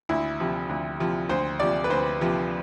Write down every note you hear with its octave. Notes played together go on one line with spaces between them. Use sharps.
D2 E4
C3 F3
D2
C3 F3
D2 C5
C3 F3 D5
B4
D2 C5
C3 F3